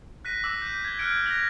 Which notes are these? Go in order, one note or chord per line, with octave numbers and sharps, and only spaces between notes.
F#6 A#6 B6 D#7
D6 E6
G6 D#7
G#6 G7
F6 F#6 G#6 C#7 D7
F#6 G#6 A#6 D7 F7 F#7